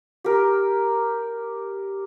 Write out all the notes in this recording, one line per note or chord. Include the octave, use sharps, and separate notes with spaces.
G4 A#4